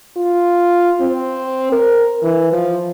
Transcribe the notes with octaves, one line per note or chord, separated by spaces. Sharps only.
F4
C4
A#4
E3
F3